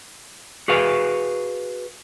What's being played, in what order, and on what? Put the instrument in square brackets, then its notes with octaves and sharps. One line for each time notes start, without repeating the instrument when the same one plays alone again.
[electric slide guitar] F#4 G#4 B4 F5